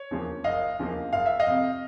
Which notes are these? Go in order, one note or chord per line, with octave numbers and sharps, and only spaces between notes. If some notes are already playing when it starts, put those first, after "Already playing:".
Already playing: C#5
E2 C#3 F3 A#3
F#1 D#5 F5
E2 C#3 F3 A#3
F#1 F5
E5
D#5 F5
F2 C3